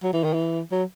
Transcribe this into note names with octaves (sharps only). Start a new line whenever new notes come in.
F#3
E3
D#3
E3
F#3